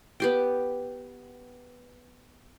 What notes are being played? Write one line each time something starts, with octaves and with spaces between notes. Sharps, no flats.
B3 G4 G5